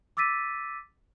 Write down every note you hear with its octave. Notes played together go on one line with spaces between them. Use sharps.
D6 E6 A6 B6 D#7